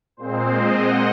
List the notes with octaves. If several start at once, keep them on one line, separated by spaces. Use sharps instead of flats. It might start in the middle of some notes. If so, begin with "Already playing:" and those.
A#2 G#3 C4 C5
D#5
F#5